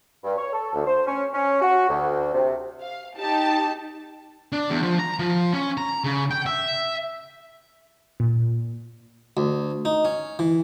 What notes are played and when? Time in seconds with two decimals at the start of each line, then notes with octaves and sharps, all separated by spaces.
0.24 G2
0.37 C#5
0.53 A4
0.73 D2
0.87 C5
1.06 C#4
1.32 C#4
1.62 F#4
1.88 D2
2.33 C3
2.81 F5
3.17 D#4 G4 A5
4.53 D4
4.70 E2
4.83 F3
4.99 A#5
5.19 F3
5.53 C#4
5.78 A#5
6.04 C#3
6.31 G5
6.46 E5
8.20 A#2
9.37 D2
9.85 D#4
10.05 C#4
10.39 E3